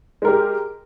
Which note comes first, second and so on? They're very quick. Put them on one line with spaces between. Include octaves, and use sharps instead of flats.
G#3 A#4 G4